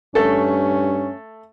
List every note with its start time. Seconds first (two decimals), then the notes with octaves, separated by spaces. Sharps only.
0.15 G2 A3 C#4 A4